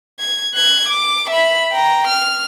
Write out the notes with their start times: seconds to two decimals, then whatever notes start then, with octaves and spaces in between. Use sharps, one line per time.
0.20 G#6
0.54 F#6 G#6
0.89 D6
1.30 E5 B5
1.72 G5 A#5
2.07 F6